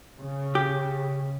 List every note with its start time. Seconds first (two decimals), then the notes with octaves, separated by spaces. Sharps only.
0.20 C#3
0.55 G4